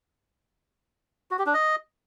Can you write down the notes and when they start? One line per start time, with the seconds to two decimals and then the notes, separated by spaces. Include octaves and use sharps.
1.31 F#4
1.39 G4
1.46 D4
1.54 D#5